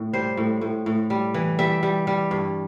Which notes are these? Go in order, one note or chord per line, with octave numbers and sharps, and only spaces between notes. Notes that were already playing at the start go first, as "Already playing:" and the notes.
Already playing: A2
G3 C5
A2
A2
A2
G3
E3
G3 E5
G3
G3
G2